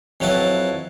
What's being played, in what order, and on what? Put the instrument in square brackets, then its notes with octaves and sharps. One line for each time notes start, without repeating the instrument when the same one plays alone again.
[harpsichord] F2 F#3 E4 B4 A5